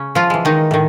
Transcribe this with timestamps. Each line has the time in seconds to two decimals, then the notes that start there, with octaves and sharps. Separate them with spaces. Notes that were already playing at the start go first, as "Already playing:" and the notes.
Already playing: C#3 C#4
0.15 F3 F4
0.30 E3 G#3
0.45 D#3 D#4
0.71 A2 D#3